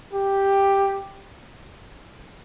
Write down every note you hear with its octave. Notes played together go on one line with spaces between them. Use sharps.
G4